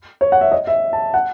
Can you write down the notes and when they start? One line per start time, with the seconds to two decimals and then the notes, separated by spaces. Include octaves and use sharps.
0.21 C#5
0.32 F#5
0.41 E5
0.52 D#5
0.67 E5
0.93 A5
1.14 F#5